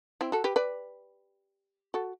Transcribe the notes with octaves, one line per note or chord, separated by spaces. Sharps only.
C4 E4
F#4 A4
G4 B4
B4 D5
F#4 A4